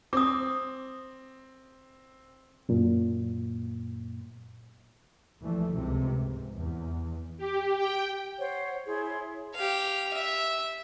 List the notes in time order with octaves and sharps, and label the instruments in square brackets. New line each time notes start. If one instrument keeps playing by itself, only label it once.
[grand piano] C4 [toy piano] D6 D#6
[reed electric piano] F#2 A#2
[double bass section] D2 E3 F3 G3 A3
C#2 C3
G#2
E2
[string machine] G4
G5
[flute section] C5 C#5 F#5
E4 G#4 C#5 C6
[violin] G4 F5
E5